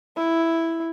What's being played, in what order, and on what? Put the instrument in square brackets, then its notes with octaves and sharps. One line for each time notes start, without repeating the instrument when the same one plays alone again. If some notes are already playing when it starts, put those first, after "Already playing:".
[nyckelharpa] E4